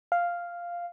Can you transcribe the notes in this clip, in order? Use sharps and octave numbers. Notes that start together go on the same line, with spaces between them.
F5